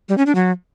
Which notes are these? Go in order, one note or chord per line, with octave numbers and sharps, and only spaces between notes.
G3
C#4
D4
F#3